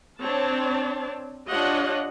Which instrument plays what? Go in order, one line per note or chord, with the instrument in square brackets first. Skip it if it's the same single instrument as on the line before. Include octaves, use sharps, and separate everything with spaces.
[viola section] C4 D4 C#5 A5
D4 F4 G4 C#5 D#5 F#5